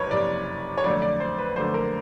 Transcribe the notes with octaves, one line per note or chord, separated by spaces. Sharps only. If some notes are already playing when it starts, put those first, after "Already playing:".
Already playing: F#1 F2 C3 B4 C#5
F#1 F2 C3 D5
C#5
F2 D3 F#3 A3 D5
D5
C5
B4
F2 D3 F#3 A3 C5
A#4